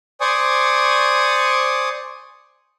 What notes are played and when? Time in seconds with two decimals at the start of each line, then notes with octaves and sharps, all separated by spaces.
0.21 C5 D5 G#5 C#6 D#6